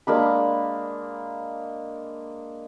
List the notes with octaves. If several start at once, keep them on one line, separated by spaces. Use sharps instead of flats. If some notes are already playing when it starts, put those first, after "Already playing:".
G#3 A#3 D4 B5